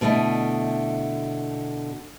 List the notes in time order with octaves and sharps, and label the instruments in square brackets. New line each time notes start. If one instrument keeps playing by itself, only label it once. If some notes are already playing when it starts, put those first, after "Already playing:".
[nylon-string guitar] B2 D3 A3 E4 D#5